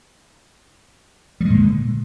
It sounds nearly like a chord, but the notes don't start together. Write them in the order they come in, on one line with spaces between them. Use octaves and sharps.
G3 G#3 A#2 D3